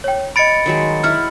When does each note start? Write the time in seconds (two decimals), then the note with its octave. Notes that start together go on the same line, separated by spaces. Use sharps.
0.04 C#5 G5
0.36 D#5 B5 A6 C#7 D7
0.66 D#3 F#3 G#3
1.03 E4 F#5 C#6 F6